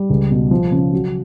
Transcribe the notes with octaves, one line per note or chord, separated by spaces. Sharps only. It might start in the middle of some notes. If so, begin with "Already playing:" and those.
Already playing: G3
C#2
B2
F3
C#3
F#3